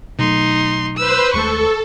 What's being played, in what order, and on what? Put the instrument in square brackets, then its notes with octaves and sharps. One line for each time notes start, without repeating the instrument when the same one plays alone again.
[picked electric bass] B2 F#3 A3 [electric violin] D#4 C6
[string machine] B4 C5 [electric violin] E6
[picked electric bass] D#2 G#3 A3 [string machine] A4 [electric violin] C#6